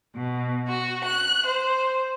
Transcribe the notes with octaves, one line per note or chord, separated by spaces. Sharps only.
B2
F#4
F#6
C5